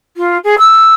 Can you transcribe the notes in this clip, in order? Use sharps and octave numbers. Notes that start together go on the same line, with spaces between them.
F4
G#4
E6